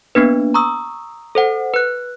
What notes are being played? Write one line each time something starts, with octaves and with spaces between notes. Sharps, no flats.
A#3 B3 D4 B4
A#5 C#6 D#6 E6
A4 C5 F#5
B4 F#6